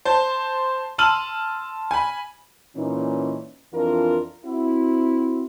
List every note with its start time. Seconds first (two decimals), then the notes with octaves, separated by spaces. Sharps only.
0.05 C5 A5
0.98 A5 C6 E6 F6 D#7 F#7
1.91 G#5 B5
2.76 A#2 E3 C#4 D#4
3.73 F2 E3 D4 F4 A#4
4.46 C4 E4 F#4